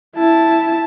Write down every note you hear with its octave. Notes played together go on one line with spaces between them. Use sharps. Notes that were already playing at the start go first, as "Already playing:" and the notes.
E4 A5